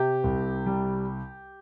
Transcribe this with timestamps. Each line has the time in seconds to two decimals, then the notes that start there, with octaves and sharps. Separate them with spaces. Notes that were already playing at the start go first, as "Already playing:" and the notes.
Already playing: C3 G4
0.24 C2
0.66 G3